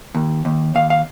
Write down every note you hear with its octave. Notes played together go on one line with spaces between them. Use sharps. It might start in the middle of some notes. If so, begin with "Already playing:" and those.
D#2
D#2
D#2 F5
F5